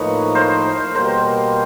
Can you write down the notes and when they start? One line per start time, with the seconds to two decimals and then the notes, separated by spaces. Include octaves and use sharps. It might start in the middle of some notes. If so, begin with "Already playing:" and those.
Already playing: A2 F3 A#3 D#4 B4 C#5
0.35 A#4 C5
0.95 B2 G3 A#3 A#4 C5